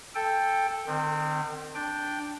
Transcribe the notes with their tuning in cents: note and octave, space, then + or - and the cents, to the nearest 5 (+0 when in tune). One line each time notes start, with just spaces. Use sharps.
A4 +0 G5 +10
D#3 -45 C4 -10
D4 +0 G5 +0